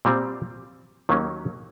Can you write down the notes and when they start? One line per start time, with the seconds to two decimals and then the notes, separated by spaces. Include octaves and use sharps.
0.05 A#2 G3 C4
1.09 D#2 D#3 F#3 A#3 C#4